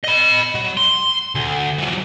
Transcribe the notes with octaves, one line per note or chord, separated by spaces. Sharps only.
D#5 B5
F#3
C6
D2
E3 F#3